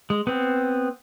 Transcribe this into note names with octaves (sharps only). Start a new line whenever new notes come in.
G#3
B3 C4